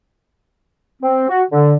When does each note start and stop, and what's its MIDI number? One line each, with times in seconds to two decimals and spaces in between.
1.02 1.27 60
1.29 1.43 66
1.51 1.75 50